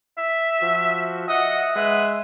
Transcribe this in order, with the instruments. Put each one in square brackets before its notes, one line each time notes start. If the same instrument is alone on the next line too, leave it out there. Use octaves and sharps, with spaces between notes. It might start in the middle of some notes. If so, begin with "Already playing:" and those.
[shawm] E5
[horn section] F3 F#4
[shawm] D#5 [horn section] E5 F#5
[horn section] G#3 E5 [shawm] B4